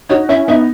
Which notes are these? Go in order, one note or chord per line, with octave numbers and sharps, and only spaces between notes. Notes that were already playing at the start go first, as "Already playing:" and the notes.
D#4 F#4 C#5
C#4 E4 E5
B3 D#4 E5